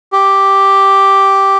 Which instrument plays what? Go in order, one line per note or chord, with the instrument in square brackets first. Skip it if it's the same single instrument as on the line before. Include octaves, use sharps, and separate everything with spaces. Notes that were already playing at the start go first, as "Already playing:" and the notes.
[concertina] G4